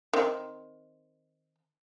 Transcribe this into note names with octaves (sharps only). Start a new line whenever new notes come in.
D#3 C4